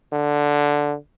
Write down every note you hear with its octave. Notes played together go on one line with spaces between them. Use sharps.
D3